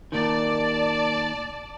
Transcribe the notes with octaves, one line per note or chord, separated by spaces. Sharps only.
A#2 D#3 D5 A5